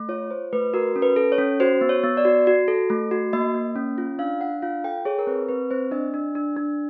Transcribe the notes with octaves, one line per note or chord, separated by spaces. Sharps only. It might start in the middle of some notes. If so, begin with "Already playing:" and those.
Already playing: A3
F4 C#5
F4 C5
A3 B4
F#4 A#4
C#4
B4
A4
C#5
C#4
F#4 C5
B3
C#5
B3
D5
F#4
F#4
A4
A3
F#4
A#3 D#5
A#3
C#4
F4
D4 F5
D4 F#5
F4 F5
A4 G5
G#4 C#5
A#4
C4 B4
C4 B4
C4 C5
D4 D#5
D4
D4
D4